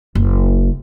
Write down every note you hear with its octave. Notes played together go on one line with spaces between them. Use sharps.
F#1